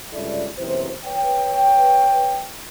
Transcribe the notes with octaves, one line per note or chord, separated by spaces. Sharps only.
C#2 G2 E4 A4 D5
F#1 B1 C3 E3 C5
B4 C#5 G5